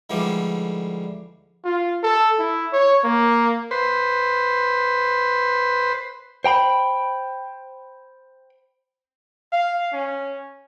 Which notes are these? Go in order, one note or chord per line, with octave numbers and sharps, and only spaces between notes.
G#2 D3 E3 F3 G3 A3
F4
A4
E4
C#5
A#3
B4 C5
C5 G5 A#5 B5
F5
C#4